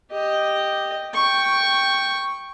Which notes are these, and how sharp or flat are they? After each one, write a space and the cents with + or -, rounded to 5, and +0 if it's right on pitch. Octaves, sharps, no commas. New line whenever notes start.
G4 +0 D#5 +0
G5 +0 C#6 +0